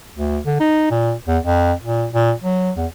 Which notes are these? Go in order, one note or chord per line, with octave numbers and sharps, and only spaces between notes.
D2
D3
D#4
A#2
E2
F2
A#2
A#2
F#3
E2